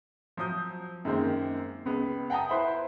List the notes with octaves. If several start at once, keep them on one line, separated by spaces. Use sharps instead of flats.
F3 F#3 D#6 G6
F#2 D#3 G#3 A#3 C4
C#2 B3
F#5 G5 A5 A#5 D#6
E4 B4 C5 E5 B5